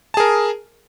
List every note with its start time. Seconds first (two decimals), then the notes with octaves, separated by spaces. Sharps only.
0.14 A5
0.17 G#4
0.20 A#4